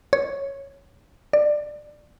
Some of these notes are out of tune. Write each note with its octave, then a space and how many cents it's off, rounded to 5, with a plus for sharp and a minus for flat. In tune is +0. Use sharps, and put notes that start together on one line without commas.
C#5 -5
D5 +15